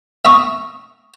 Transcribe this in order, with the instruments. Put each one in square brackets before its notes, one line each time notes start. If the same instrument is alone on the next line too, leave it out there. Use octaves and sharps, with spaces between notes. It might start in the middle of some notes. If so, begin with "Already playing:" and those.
[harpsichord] E5 A#5 C#6 D#6